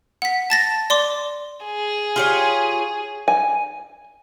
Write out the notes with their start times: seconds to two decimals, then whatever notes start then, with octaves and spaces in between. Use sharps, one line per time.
0.22 F#5 B6
0.50 A5 A6 A#6
0.90 D5 C6 D6
1.65 G#4
2.16 F4 G4 C#5
3.28 G#5